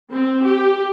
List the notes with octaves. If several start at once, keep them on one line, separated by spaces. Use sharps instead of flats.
C4
G4